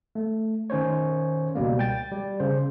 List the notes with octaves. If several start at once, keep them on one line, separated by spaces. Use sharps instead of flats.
A3
D#3 C#4 C5 C#5
C#2 B2 G3 A#3
G5 A6
G3
C#3 C5